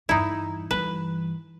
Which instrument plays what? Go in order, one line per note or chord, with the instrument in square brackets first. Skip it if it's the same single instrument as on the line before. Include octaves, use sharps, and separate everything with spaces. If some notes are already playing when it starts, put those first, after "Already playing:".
[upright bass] E2 G2 [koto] D#4 E4
[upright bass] G2 E3 [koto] B4